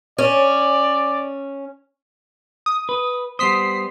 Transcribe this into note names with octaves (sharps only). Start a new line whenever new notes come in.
C#4 D5
D#6
B4
G3 B3 C5 D#6 B6 C7